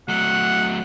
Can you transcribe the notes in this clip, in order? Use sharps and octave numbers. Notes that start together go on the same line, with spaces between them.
F#3 A3 F#5